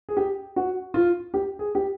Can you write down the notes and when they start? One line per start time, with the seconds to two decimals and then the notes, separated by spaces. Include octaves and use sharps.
0.09 G#4
0.17 G4
0.56 F#4
0.94 F4
1.34 G4
1.59 G#4
1.75 G4